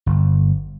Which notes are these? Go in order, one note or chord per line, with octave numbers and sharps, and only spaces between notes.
G1